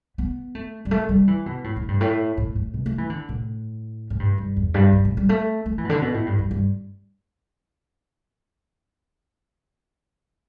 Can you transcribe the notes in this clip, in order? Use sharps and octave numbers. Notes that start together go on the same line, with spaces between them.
B3
A3
G3
A3
G3
E3
B2
A2
A2
G2
A2
A2
A2
B2
A3
E3
D3
A2
A2
G2
G2
E2
G2
G2
A2
G3
A3
A3
E3
B2
D3
B2
A2
G2
G2
G2